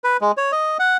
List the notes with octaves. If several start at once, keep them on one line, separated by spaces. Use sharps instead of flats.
B4
G#3
C#5
D#5
F#5